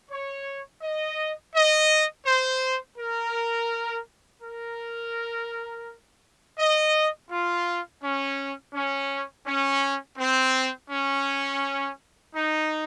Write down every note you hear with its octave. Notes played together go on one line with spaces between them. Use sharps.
C#5
D#5
D#5
C5
A#4
A#4
D#5
F4
C#4
C#4
C#4
C4
C#4
D#4